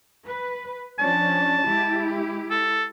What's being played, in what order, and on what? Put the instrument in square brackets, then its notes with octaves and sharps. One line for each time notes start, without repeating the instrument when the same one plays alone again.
[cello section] B4
[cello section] F3 C#4 D4 [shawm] A5
[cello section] G#3 E4 G4
[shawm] A4